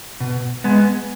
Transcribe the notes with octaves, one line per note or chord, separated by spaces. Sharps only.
B2
G#3 B3